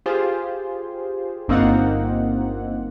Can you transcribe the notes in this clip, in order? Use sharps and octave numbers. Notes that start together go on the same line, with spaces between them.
F4 G4 G#4 C5
G1 A#3 C4 D#4 F4 F#5